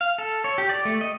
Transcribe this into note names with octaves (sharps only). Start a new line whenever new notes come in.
F5
A4
C#5
G4
D5
A3
D#5